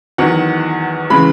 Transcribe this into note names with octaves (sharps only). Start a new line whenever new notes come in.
E2 D#3 F#3 F#5
C#3 E3 G#3 B5